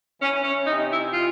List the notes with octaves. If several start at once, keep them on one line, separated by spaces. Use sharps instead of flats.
E3 C#4
C#4
C3 D#4
E4
E3 F4